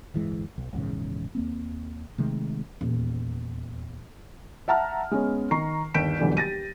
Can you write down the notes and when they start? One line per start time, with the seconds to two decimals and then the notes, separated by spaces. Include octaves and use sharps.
0.14 D1 G1 E3 G#3
0.58 B1
0.73 A#1 E2 G#2 C#3
1.35 D#2 A#3 C4
2.18 C3 D#3 G#3 A3
2.81 D#1 E2
4.68 E5 F#5 A5 A#5 F6
5.11 G#3 B3 C#4
5.51 D#3 A#5 C#6 C7
5.94 G1 D#2 G6 B6 D7 E7
6.19 D#1 B1 E2 D3 D4
6.37 G4 A6 A#6 D#7